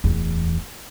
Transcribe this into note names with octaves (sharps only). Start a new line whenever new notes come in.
D1 E2